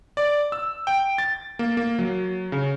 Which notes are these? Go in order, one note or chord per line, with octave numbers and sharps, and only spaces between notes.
D5
E6
G5
A6
A#3
A#3
F#3
C#3